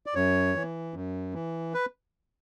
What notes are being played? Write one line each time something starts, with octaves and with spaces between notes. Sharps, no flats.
D5
F#2 C#5
E3
F#2
E3
B4